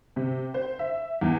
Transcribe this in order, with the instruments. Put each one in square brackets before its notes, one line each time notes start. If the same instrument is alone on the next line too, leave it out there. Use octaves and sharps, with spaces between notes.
[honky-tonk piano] C3
C5
E5
E2